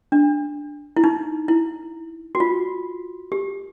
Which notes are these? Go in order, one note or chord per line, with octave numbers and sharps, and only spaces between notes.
D4
E4
D#4
E4
F#4
F4
G4